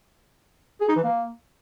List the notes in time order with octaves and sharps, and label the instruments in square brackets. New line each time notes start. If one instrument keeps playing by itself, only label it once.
[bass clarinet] G#4
D#4
E3
A#3